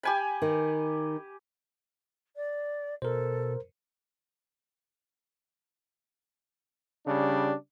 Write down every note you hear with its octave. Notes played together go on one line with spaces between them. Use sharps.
G4 G#5 B5
D#3
D5
B2 A4 A#4 C5
C#3 G3 D4